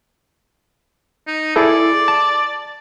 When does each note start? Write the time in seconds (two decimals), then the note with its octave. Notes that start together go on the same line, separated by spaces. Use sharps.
1.27 D#4
1.56 E4 G#4 A4 D5
2.08 A5